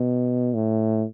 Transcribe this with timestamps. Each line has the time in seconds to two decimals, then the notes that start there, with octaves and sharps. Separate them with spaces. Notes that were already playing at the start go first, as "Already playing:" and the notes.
Already playing: B2
0.54 A2